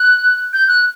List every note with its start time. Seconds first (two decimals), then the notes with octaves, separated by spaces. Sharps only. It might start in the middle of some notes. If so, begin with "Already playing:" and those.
Already playing: F#6
0.53 G6
0.68 F#6